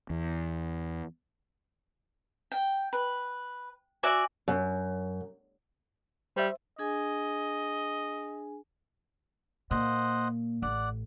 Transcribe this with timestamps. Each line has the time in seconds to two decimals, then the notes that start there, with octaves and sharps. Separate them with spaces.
0.10 E2
2.52 G5
2.93 B4
4.03 F#4 D5 E5 G#5
4.48 F#2
6.36 G3 C5 E5
6.79 D4 G#4 D#5 G#5
9.71 A#2 C5 D#5 F#5
10.62 A1 D5 F#5